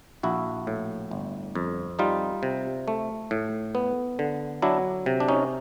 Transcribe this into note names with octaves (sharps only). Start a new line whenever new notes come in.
A#1 E4 F#4
A2
G1
F2
G3 D#4 F4
C3
A3
A2
B3
D3
F#3 D4 E4
C3
D4
C#4 D#4